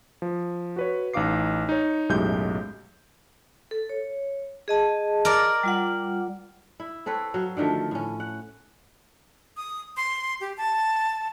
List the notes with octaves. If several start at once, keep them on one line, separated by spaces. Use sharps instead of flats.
F3
F#4 B4 C#5
A1 D#4 F5 D6 C7
D#4 C#5
B1 F#2 A2 G#3 G4 G6
A4
C#5
G#4 D#5 A5
A#4 D5
G3 F4 F#5
E4
C4 A4 B4 C#5
F#3 F5
D3 D#3 F3 A3
A2 C#4
F#5
D#6
C6
G4
A5